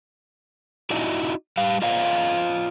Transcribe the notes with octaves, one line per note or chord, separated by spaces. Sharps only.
D#4 E4 F#4 D5 D#5
G3 G4 F5
F4 C5 D5 D#5 F5